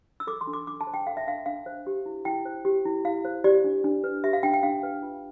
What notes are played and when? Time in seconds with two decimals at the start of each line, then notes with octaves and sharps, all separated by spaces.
0.20 E6
0.27 A4 D6
0.41 C6
0.47 D4
0.53 D6
0.67 D4 D6
0.81 A5
0.87 C5
0.94 G5
1.07 A4 F5
1.17 E5
1.27 D4 F5
1.46 D4 F5
1.66 C5
1.87 G4
2.06 E4
2.25 E4 G5
2.45 C5
2.65 G4
2.85 E4
3.04 E4 F5
3.25 C5
3.44 G4 D5
3.64 D4
3.84 D4
4.04 B4
4.24 G4 E5
4.33 F5
4.43 D4 G5
4.54 G5
4.63 D4 F5
4.83 B4
5.03 F4